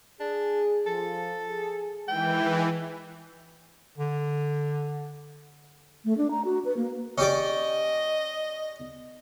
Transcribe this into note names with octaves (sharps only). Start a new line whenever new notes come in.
D4 G#4
F3 A4
G#4
D#3 E3 G#3 G5
D3
A3
D4
A#5
F#4
B4
A#3
C#4 G4 D5 D#5